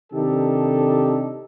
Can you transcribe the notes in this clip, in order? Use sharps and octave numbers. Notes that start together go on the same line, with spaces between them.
C3 D#3 D4 D#4 G4 A4